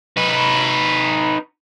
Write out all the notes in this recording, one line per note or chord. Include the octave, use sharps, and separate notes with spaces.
D#4 B4